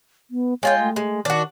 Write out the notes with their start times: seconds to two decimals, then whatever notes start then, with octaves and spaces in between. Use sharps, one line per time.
0.31 B3
0.63 G#3 F4 C#5 G5
0.80 A3
0.96 G#3
1.25 D#3 D4 F#4